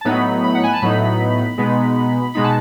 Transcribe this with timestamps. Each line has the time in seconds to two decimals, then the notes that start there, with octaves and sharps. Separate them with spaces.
0.01 A5
0.05 A2 F#3 B3 D#4 B5
0.44 B5
0.55 F#5
0.63 G#5
0.73 A5
0.82 A2 F#3 B3 D#4 B5
1.58 B2 G#3 B3 D#4
2.34 B2 G#3 B3 D#4 B5
2.44 A5